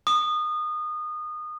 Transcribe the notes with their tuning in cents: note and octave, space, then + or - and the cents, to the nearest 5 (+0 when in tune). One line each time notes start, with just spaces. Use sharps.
D#6 -25